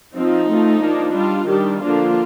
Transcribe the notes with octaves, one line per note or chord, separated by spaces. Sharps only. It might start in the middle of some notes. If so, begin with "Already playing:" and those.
F3 C4 D#4
F3 A3 C4
F3 A#3 D4
G3 D4 F4
D#3 G3 D4 G4
D3 F3 A#3 D4 F4